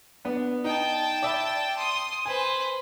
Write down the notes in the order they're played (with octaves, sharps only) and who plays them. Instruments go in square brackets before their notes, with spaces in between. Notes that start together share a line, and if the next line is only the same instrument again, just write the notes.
[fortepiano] B3 D4
[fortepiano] D#4 [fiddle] G5 A5
[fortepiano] D5 E5 B5
[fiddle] C6 D#6
[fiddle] B4 C5 [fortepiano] G#5